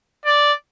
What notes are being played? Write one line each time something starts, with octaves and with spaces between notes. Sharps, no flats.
D5